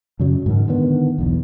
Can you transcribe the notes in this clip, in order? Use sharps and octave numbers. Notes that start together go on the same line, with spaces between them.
F#2 C#3 F#3
G#2 D#3
D3 D#3 B3
B1 E2